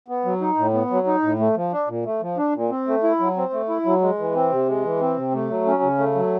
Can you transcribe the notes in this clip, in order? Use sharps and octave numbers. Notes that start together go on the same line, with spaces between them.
B3
F#3
D#4
A2
B3
F#3
D#4
A2
A3
F3
D4
A#2
A3
F3
D4
A#2
C4
A3
E4
F#3
C4
A3
E4
F#3
G#3
E3
C4
C3
G#3
E3
C4
C3
A3
F#3
C#4
C#3
A3
F#3